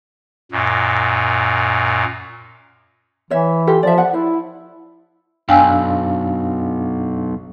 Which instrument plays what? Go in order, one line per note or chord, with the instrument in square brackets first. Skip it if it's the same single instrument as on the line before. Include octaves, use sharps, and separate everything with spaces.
[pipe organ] F#2 A#2
[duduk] E3 [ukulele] C#5 E5
[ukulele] F4 G4 A4
[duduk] F3 [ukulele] D5 E5
[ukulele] D5 F#5
[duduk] E4 [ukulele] C5
[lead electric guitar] B1 [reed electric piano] F#2 D4 F5 [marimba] G5 G#5 E6